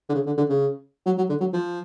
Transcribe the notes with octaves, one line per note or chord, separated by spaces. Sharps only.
D3
C#3
D3
D3
C#3
F#3
F#3
D3
F#3
F3